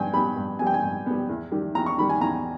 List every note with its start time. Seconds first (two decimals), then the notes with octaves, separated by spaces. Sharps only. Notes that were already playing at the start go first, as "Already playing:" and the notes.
Already playing: G2 B3 G5 G#5
0.13 G3 B3 B5
0.36 G2
0.59 G3 B3 G#5
0.67 G5
0.74 G#5
0.83 G2
1.06 G3 B3
1.29 E2
1.52 D#3 G3
1.75 E2 A#5
1.86 C#6
1.98 D#3 G3 B5
2.09 G#5
2.21 E2 A#5